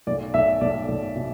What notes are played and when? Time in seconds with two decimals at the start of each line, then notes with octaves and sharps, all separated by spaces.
0.07 B1 D5
0.34 B1 E5
0.61 B1 D5
0.88 B1
1.16 B2